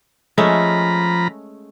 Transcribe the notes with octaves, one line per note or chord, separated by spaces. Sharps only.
F3 G#3 A3 C#4 A#5 B5